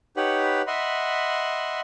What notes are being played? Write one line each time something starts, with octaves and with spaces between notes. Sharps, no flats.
D#4 G4 B4 C#5 F#5 B5
D#5 E5 F#5 B5 C6